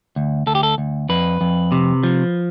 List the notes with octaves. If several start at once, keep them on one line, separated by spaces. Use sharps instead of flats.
D2
D2 A4
G4
A4
D2
F2 B4
F2
C3
F3